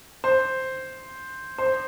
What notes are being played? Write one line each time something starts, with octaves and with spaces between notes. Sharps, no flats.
C5
C5